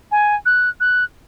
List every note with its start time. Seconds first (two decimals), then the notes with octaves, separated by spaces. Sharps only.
0.11 G#5
0.46 F#6
0.80 F#6